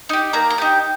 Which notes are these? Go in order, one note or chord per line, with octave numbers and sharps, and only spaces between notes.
D#4 G4
A#3 A#5
A#5
D#4 G4